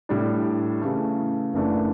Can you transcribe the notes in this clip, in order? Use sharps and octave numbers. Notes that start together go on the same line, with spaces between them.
A2 G3 D4
C#3 E3 A3
F#1 F#2 E3 A3 D4